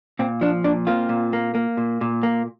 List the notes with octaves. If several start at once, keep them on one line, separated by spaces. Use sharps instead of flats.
A#2 C4
F3 D4
A#2 D4
A#3 C4 F4
A#2
A#3
A#3
A#2
A#2
A#3